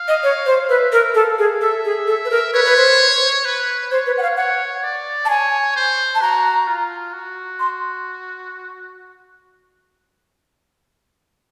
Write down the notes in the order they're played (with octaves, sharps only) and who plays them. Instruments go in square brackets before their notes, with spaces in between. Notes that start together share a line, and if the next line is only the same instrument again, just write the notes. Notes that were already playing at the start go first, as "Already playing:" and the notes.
Already playing: [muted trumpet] F5
[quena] D#5
C#5
C5
[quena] B4 [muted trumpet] E5
[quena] A#4
[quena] A4 [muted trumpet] F5
[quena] G#4
[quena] A4 [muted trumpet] E5
[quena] G#4
A4
B4
A#4
[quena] B4 [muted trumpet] C#5
[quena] B4
C5
[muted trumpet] B4
[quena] C5 [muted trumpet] C#5
[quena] B4
F#5
F5
[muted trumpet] C#5 [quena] F#5
[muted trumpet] D5
[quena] A5
[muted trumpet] C#5 [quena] G#5
[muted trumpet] C5
[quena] A5
[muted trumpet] F#4 [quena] A#5
[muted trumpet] F4
F#4
[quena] C6